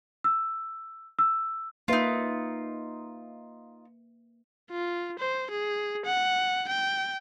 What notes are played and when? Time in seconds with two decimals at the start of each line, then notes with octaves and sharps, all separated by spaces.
0.24 E6
1.19 E6
1.88 A#3 D#4 F4 B4 E5
4.70 F4
5.19 C5
5.50 G#4
6.06 F#5
6.69 G5